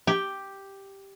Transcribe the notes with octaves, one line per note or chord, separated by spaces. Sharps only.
G4